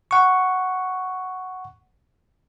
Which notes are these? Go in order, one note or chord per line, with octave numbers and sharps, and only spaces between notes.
F#5 C#6